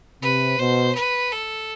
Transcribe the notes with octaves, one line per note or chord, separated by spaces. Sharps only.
C3 B4
B2 C5
B4
A4